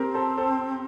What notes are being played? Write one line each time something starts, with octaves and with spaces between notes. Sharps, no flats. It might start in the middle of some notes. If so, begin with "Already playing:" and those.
Already playing: C4 G4 A4 A#4 C5
A4 C5
A4 C5